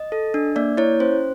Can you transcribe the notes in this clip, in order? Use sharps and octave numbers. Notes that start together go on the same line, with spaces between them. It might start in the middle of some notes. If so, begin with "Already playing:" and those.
Already playing: D#5
A4
D4
A#3 D5
E4 C#5
C#4 C5